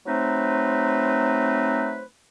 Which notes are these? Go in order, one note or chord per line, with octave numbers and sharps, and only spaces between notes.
F#3 A3 C4 D#4 B4 C5